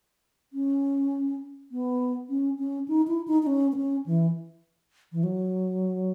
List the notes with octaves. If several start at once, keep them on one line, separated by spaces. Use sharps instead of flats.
C#4
B3
C#4
C#4
D#4
E4
D#4
D#4
C#4
B3
C#4
E3
E3
F#3